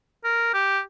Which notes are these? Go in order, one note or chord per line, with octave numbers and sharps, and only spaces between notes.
A#4
G4